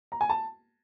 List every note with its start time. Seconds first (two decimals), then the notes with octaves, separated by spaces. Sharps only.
0.12 A#5
0.21 G#5
0.30 A5